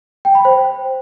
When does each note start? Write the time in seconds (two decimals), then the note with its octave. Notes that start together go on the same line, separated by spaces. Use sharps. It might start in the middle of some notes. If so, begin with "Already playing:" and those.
0.25 G5
0.35 B5
0.45 C5